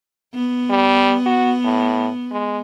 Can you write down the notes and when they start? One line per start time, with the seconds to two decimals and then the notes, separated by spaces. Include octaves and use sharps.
0.34 B3
0.70 G3
1.26 F#4
1.64 A2
2.32 G#3